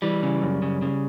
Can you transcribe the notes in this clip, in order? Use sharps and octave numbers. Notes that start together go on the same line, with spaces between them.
E3 G3
C#3
F#2
C#3
C#3